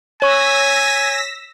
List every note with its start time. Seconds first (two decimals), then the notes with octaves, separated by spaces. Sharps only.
0.22 C#5 G#5 C#6 E6 A#6 B6